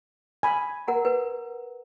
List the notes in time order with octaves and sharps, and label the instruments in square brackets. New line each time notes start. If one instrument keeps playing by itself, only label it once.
[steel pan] G#5 B5
[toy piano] A#4 F#5 A#5
A#4 B4